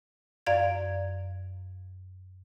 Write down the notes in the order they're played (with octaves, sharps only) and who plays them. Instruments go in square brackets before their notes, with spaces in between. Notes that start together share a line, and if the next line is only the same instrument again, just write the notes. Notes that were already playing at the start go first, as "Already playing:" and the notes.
[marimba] F#2 D5 F5 G#6